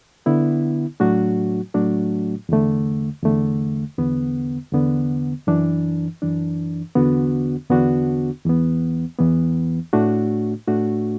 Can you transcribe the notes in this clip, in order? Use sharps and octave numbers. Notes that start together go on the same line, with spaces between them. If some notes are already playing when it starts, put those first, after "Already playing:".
D3 B3 E4
A2 F#3 A3 D4 F#4
A2 F#3 A3 D4 F#4
E2 D3 A3
E2 D3 A3
E2 D3 B3
E2 D3 B3
F#2 E3 D4
F#2 E3 D4
E2 D3 B3 D4 F#4
E2 D3 B3 D4 F#4
E2 E3 B3
E2 E3 B3
A2 A3 D4 F#4
A2 A3 D4 F#4